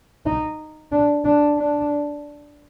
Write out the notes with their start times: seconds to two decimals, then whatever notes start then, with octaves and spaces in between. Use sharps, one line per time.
0.26 D#4
0.92 D4
1.24 D4
1.57 D4